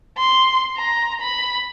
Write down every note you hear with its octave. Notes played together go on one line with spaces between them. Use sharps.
C6
A#5
B5